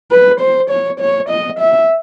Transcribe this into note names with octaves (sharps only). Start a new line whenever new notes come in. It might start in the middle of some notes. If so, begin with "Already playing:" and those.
B4
C5
C#5
C#5
D#5
E5